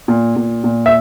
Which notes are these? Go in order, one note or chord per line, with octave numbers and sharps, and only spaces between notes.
A#2
A#2
A#2
E5